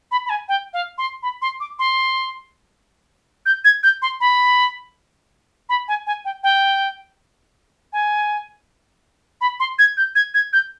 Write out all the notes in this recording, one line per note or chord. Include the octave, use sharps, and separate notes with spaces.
B5
B5
G#5
G5
F5
C6
B5
C6
D6
C6
G6
G#6
G6
C6
B5
B5
G#5
G#5
G5
G5
G#5
B5
C6
G#6
G6
G#6
G#6
G6